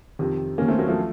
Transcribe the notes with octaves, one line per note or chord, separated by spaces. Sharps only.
F2 C3 D#3
D#2 D#3 A#3 C#4
A3 C4
F#3 A#3
F3 A3